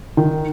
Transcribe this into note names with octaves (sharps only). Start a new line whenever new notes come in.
D#3